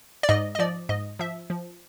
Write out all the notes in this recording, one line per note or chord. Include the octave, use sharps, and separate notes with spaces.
D5
G#2 D#5
D#5
F3 D5
G#2 D#5
F3 E5
F3